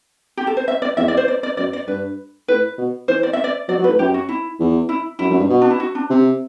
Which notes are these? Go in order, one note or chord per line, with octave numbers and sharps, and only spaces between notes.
G4
A4
C5
E5
D5
E2 E5
D5
C5
D5
D5
F#2 D5
D5
G2 B4
A2 B4
B2
E3 C5
D5
E5
D5
F#3 D5
F#3
B4
A2
F#2 G4
F#4
E4
E2
E4
F#2 E4
F#2
G2
B2
D4
E4
F#4
D4
C3